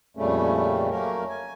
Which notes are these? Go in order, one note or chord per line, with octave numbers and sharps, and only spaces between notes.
F2 A#2 C#3 G3 A3 C#4
F#3 A3 A#3 C#4 A#4
G#5